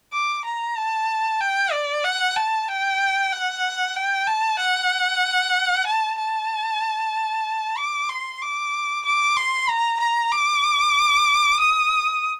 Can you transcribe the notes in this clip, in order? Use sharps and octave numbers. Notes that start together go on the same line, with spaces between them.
D6
A#5
A5
G5
D5
F#5
A5
G5
F#5
G5
A5
F#5
A5
A5
D6
C6
D6
D6
C6
A#5
A#5
D6
D#6